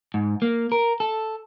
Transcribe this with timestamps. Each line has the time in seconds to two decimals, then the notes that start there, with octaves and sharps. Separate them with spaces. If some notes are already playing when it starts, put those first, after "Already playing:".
0.14 G#2
0.42 A#3
0.72 A#4
1.00 A4